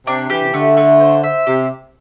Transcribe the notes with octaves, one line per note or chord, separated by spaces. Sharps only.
C3 D4
E3 G4
C3
D3 A3
A3
C5
E5
C3 G4